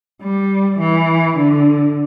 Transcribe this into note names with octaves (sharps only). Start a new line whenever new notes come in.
G3
E3
D3